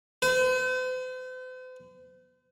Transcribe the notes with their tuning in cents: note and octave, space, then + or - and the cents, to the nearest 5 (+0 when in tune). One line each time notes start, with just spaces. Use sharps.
C5 -45